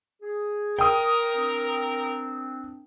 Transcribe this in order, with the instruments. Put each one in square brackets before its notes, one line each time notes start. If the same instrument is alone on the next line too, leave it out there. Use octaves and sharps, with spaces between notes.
[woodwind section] G#4
[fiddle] A#4 [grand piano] G5 D#6
[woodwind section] C4 D4